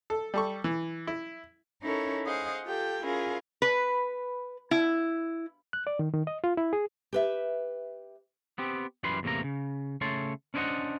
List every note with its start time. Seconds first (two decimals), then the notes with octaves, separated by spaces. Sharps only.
0.10 A4
0.34 G3 A4 C#6
0.64 E3
1.07 E4
1.82 C#4 D#4 E4 A4 A#4 C#5
2.26 G#4 C5 D#5 F5 F#5
2.64 F4 G4 A4 G5
3.03 C#4 E4 F4 G#4 A#4
3.62 B4
4.71 E4
5.73 F#6
5.87 D5
5.99 D#3
6.14 D#3
6.27 D#5
6.44 F4
6.57 E4
6.73 G#4
7.13 G4 B4 E5
8.58 B3 C4 G4
9.03 F#2 E3 G3 B4 B5 C6
9.23 E2 A2 C3 A#3 A#5
9.44 C#3
10.01 C#3 A3 C#5 A5 C6
10.54 C#4 D4 E4 C5 D#5 F#5